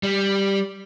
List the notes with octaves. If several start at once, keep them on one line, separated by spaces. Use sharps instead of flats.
G3